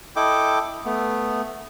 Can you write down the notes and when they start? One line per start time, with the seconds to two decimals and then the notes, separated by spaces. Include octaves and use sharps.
0.16 E4 A4 D#5 G5 D6
0.85 A3 B3